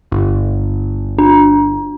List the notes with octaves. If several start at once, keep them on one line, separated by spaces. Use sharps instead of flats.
G1
D4